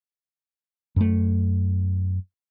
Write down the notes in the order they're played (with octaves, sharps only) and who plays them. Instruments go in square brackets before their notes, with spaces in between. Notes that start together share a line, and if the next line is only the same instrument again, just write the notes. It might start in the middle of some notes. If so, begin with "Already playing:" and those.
[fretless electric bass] F#2 A3